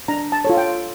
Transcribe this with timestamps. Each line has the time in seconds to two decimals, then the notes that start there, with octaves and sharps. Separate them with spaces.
0.08 D4 A#5
0.32 A5
0.45 F4 A4 C#5
0.57 G5